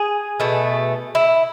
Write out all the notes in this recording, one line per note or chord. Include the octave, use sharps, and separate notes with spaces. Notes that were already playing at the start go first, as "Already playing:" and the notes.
Already playing: G#4
B2 A3
E4